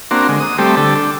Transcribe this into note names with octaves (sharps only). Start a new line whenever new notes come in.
A#3 C4 D4 F#4
D3 G#3
D#6
G3 A3 C4 G4
D3 G4 A4
D4